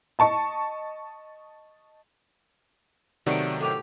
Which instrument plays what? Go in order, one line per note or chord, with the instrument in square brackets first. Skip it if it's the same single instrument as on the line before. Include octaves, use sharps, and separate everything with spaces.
[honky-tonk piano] D#5 A5 C#6
[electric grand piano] C3 D#3 [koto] F#3 A3 B3 [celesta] D5 C#7 D7
[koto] A2 G4 [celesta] A4 D6 F7